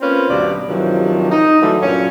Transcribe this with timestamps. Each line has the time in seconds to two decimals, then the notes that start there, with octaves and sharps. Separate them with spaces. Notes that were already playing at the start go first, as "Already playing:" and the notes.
0.01 A#3 C4 C#4 F4 B4
0.29 D2 G2 B2 F#3 D5
0.67 G2 C3 D#3 F3 F#3
1.30 D#4
1.61 D3 E3 F#3 G3 A3
1.80 G2 A#2 F#3 C#4